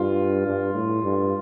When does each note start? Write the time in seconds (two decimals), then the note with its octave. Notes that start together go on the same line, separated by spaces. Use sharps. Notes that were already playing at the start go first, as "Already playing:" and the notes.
Already playing: G2 F4
0.46 G2
0.74 A2
1.03 G2